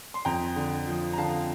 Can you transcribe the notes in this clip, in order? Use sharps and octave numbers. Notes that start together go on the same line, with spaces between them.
C6
F2 G5 A#5
D3
F3
A#5
D3 F5 A5